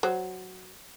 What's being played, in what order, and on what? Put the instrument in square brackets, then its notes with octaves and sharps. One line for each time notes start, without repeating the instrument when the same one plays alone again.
[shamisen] F#3 C5